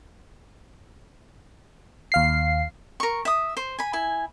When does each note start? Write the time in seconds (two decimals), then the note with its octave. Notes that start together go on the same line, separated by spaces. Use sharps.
2.12 D#2 F5 C7
3.00 A#4 C#6
3.25 E5 D#6
3.57 C5
3.79 G#5 B5
3.93 E4 G#5